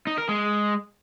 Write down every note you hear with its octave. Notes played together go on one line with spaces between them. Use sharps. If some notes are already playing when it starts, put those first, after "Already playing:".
D#4
A#4
G#3